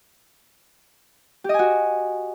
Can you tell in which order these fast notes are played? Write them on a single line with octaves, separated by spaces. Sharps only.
G4 D#5 G#5 F#4